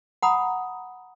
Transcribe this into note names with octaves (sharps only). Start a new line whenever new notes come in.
F#5 A#5 B5 D#6